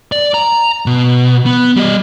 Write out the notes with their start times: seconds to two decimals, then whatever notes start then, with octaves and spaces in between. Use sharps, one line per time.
0.12 D5
0.34 A#5
0.86 B2
1.46 B3
1.77 G3 D#5